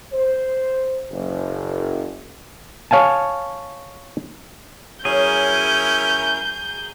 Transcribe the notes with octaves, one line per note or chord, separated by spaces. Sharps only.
C5
F#1
C#5 F5 G#5 A5
F#3 C#4 E4 G#4 A#4 G6